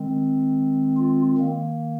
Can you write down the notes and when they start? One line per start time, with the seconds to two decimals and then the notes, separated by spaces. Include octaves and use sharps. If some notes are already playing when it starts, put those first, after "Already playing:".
Already playing: D#3 G#3 C4
0.97 F4
1.38 D#3 A#3